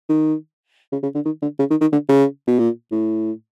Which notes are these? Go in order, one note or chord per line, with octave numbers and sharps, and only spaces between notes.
D#3
C#3
C#3
D3
D#3
D3
C#3
D#3
D#3
D3
C#3
B2
A#2
A2